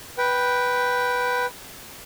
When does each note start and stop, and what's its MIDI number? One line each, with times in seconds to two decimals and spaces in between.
0.18 1.46 71
0.18 1.46 79